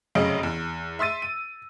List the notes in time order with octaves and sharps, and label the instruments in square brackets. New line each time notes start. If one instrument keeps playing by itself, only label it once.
[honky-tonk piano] F1 F#2 C#3 C#4 D#5 D7
E2
E5 C6 E6 A6 D#7
D#7